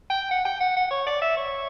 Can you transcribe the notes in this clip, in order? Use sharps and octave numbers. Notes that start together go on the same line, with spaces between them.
G5
F#5
G5
F#5
F#5
C#5
D5
E5
C#5